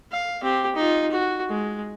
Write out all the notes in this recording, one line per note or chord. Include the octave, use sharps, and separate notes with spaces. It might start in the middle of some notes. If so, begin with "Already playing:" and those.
F5
C4 G4
D#4 F4
F#4
G#3